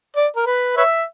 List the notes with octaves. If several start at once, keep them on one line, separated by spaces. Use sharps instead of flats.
D5
A#4
B4
B4 C#5 E5